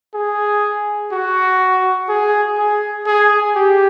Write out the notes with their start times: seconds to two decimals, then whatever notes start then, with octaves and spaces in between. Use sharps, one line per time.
0.15 G#4
1.12 F#4
2.09 G#4
2.58 G#4
3.07 G#4
3.55 G4